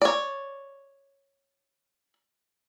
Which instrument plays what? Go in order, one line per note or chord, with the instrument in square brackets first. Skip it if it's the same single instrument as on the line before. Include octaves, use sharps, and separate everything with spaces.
[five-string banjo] C#5 D5